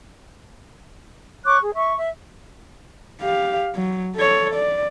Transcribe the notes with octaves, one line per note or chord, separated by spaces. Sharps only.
C#5 C#6 D6 F#6
G#4
E5 C#6
E5
G4 F5
F#3
A4 C#5
D5